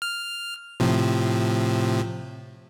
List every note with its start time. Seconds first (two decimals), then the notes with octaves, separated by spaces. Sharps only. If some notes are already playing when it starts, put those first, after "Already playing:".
0.02 F6
0.80 A2 C3 F3